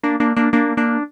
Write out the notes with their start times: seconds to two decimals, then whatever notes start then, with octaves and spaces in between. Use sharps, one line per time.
0.03 A#3 D4
0.20 A#3 D4
0.36 A#3 D4
0.53 A#3 D4
0.77 A#3 D4